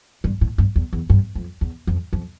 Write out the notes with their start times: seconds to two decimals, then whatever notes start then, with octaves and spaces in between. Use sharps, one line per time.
0.24 G2
0.41 A2
0.58 G2
0.76 E2
0.93 E2
1.10 G2
1.35 F2
1.61 E2
1.87 F2
2.13 F2